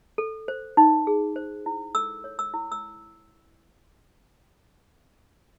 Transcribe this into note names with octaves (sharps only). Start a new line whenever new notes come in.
A4
C5
D#4
G#4
C5
E4
A4 E6
C#5
E6
E4
E6